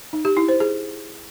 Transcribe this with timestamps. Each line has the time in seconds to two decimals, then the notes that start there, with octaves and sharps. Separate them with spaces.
0.13 D#4
0.25 G4
0.37 E4
0.48 C5
0.60 G#4